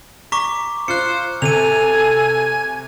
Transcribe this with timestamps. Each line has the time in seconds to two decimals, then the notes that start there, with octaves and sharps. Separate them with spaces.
0.32 A#5 C#6 D6 B6
0.88 F4 C5 F#6 C#7
1.42 C3 A4 G#5 D#7 F7